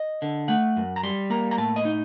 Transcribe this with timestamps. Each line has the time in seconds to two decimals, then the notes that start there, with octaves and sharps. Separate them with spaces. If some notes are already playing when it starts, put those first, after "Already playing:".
Already playing: D#5
0.22 D3
0.48 A3 F#5
0.76 F#2
0.96 A#5
1.03 G3 C6
1.30 A#3 A#5
1.51 A#5
1.58 A2 A5
1.76 D#5
1.85 D#4